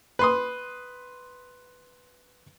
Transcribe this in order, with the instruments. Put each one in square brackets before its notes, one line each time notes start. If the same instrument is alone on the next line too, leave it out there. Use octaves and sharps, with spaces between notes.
[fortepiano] B4 C6 D#6